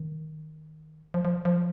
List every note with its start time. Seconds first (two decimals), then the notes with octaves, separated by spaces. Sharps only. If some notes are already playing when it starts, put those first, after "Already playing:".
Already playing: D#3
1.14 F3
1.25 F3
1.45 F3